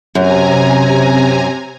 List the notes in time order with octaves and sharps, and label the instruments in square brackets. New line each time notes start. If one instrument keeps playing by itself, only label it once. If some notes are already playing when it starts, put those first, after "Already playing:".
[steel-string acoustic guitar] F#2 [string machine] C3 G#5 A#5